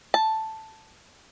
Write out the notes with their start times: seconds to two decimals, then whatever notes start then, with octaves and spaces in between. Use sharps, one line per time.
0.14 A5